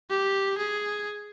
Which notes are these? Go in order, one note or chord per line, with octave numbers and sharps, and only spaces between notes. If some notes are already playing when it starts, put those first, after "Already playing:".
G4
G#4